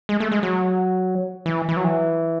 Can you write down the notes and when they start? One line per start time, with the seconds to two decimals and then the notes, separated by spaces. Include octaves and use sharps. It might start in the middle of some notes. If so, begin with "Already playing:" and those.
0.09 G#3
0.20 A3
0.32 G#3
0.43 F#3
1.46 E3
1.69 E3
1.77 F#3
1.84 E3